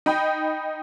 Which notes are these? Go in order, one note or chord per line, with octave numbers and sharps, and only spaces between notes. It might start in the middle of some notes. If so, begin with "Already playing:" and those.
D#4 G5 B5